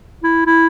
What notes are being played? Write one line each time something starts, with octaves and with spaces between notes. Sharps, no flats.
E4
E4